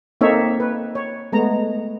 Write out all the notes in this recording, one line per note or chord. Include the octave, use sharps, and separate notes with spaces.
A#3 C4 D#4 A4 C#5 E5
B4
C#5
G#3 A3 B3 A#5